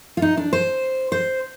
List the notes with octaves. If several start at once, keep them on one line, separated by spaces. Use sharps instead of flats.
F4
D#4
D4
C5
C5